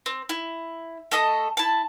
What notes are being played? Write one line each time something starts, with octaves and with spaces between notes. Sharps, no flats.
C4
E4
A3 A4 D#5 D#6
E4 A5